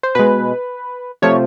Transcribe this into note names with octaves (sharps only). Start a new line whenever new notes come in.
C5
B2 G#3 B4
C3 F3 A3 C#5